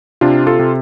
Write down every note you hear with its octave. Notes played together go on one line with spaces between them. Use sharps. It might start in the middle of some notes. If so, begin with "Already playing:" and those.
C3 D4 F4
F4 A4
C3